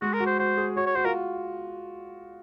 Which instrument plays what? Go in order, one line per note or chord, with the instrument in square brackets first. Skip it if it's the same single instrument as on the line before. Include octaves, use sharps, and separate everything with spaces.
[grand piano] G#3 [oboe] F#4
[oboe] A#4
[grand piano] F#4
[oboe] C5
[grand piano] F#4 [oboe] C5
[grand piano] G#4
[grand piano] F#4 [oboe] C#5
[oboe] C#5
[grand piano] F#4 [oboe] C5
[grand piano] F4 [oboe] A#4